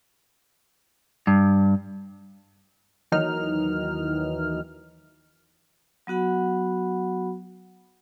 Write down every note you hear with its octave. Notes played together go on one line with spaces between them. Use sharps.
G2
D#2 D#3 E3 F#3 D#4 F6
F#3 B3 F#4 F#5 B5